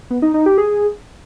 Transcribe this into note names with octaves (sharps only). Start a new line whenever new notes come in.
B3
D#4
D#4
G4
G#4